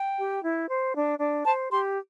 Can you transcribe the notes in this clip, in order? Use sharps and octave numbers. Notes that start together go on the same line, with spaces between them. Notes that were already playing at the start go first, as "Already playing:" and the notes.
Already playing: G5
G4
E4
C5
D4
D4
C5 A5
G4 C6